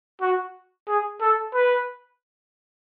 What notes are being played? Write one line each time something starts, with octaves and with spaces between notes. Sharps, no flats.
F#4
G#4
A4
B4